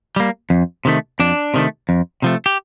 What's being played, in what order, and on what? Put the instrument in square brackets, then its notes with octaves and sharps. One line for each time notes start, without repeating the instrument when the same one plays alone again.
[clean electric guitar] G3 A#3
F2
C3 D#3 A3
F2 D4
C3 D#3 A3
F2
C3 F3 A3
G4